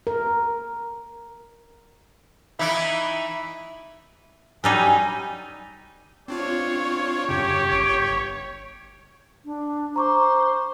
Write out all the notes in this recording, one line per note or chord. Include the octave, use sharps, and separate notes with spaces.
A#4
E3 D#4 E4 E5 B5
F#3 G3 D#4 G#5
C4 D4 F4 C#5
F#2 C#3 G4
G1
D4
C5 A#5 C#6 D6